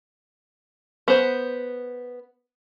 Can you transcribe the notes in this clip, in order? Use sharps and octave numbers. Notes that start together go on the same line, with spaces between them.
B3 C5